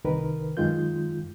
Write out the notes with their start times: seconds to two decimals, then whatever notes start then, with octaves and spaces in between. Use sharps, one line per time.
0.04 C2 D#3 A#4 B4
0.57 F#2 D#3 G#3 F4 G6